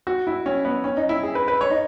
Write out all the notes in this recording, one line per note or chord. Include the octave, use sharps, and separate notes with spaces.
F#4
E4
C#4
B3
C#4
D#4
E4
G#4
B4
B4
C#5
D#4